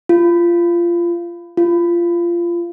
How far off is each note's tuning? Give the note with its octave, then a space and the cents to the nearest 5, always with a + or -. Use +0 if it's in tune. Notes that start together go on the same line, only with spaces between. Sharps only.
F4 -20
F4 -20